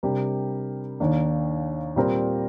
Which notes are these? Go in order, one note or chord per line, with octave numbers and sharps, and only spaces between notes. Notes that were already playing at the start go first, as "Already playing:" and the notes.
C3 G3 D4 G4 A#4
D#2 D#3 A#3 D4
A#2 G3 C4 G4 A#4